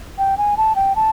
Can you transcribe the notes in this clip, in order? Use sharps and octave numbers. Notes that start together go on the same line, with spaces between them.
G5
G#5
A5
G5
A5